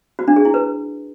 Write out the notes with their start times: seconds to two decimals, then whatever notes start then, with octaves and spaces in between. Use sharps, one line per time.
0.19 F#4
0.28 D4
0.36 G#4
0.45 E4
0.54 B4